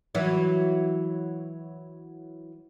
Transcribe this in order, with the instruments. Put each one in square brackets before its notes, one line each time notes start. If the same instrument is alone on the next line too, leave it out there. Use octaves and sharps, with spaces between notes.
[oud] E3 F#3